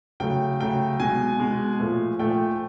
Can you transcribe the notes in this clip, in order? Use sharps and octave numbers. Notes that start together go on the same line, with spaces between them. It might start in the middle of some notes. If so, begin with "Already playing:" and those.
C#3 F#3 A3 G5
C#3 F#3 A3 G5
B2 G#3 G#5
B2 G#3
A#2 F3 A3
A#2 F3 A3 G5